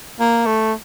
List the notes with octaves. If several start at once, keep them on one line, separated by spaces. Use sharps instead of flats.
A#3
A3